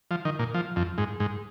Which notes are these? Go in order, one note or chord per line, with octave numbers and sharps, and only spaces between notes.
F3
D#3
A#2
F3
F2
G#2
G#2